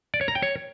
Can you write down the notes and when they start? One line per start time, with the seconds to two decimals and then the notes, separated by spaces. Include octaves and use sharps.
0.14 D5
0.21 C#5
0.28 A#5
0.35 G5
0.43 C#5